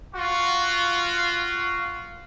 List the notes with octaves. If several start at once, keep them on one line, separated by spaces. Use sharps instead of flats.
F4 F#4